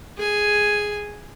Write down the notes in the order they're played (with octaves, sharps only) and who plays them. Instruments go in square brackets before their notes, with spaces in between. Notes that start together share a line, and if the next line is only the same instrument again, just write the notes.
[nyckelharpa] G#4 G#5